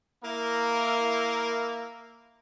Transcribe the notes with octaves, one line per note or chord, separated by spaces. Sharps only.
A#3 E4 A#4